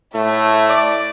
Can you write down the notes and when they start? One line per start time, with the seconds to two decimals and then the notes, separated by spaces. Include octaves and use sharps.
0.15 A2 A3 E5
0.69 D5